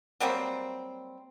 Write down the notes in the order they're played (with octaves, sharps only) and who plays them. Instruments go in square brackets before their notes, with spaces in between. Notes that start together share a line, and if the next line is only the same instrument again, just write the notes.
[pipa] F#3 G3 A#3 C4